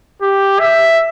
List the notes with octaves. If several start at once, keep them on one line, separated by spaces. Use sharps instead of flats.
G4
E5